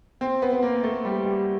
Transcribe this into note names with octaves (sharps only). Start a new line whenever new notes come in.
C4
B3
B3
A#3
A3
G3
G3